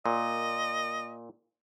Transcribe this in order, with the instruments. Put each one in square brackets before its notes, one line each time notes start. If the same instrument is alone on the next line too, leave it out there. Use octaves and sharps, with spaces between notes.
[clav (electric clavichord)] A#2 [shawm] D#5